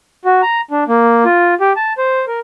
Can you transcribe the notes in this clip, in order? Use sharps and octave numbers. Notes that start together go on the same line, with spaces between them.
F#4
A#5
D4
A#3
F4
G4
A5
C5
A#4